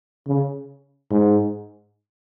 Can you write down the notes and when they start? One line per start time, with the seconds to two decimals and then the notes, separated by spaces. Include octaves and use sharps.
0.27 C#3
1.11 G#2